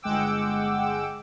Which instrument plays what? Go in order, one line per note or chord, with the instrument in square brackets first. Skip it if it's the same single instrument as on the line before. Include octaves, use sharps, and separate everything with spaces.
[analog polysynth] G1 G#3 F#5 G5 D6 E6